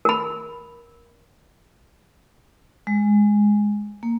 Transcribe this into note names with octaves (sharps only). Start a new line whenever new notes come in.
A#4 B5
G#3
A#3